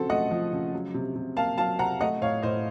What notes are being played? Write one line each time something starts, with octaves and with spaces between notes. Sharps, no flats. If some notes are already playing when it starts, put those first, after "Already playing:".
Already playing: C#3 F3 C4 F#4 A4
A3 D#5 F#5
F3
C#3
F#3
C3
C3
A#3 F5 A5
F#3 F5 A5
C3 F#5 A#5
A3 D#5 F#5
A2 C#5 F5
A2 C5 D#5